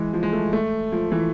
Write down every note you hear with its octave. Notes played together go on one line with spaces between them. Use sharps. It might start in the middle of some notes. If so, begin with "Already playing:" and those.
Already playing: E3 G#3
F3
G#3
A3
A3
F3
E3